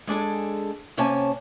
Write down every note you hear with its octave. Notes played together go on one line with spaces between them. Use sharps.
G#3 D4 G#4 A4
C3 A#3 C#4 C#5 G#5 A5